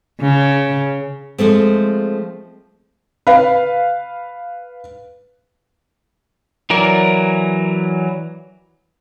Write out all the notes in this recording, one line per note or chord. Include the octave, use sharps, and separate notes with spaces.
C#3
F3 G#3 A3 C4
B4 F5
E3 F#3 A#4 D5